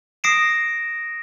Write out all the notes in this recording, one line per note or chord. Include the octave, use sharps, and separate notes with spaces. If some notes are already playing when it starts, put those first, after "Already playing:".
D#6 A#6 C7 D7 E7